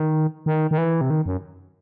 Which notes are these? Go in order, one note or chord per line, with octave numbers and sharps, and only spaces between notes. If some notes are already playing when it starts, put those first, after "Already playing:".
Already playing: D#3
D#3
D#3
E3
C3
D#3
F#2